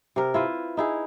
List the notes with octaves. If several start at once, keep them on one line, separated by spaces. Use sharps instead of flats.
C3 A#4
E4 F4 B4
D#4 E4 G#4